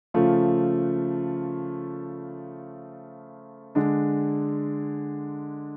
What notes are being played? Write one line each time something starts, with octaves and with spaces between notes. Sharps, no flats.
C#3 F3 A3 F4
D3 G#3 D4